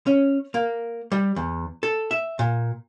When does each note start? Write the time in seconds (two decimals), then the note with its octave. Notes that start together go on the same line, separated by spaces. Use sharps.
0.07 C#4
0.54 A#3
1.12 G3
1.36 E2
1.83 A4
2.11 E5
2.39 A#2